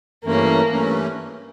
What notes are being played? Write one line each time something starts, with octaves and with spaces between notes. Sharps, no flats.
G2 E3 A3 A#3 C#4
G2 E3 A3 C#4